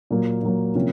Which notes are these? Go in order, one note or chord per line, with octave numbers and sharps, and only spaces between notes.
A#2 F#3 A#3
A#2 F#3 A#3
C3 F3 A#3 C#4